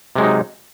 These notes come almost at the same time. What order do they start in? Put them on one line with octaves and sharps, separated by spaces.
C3 G#3 F#3 D#4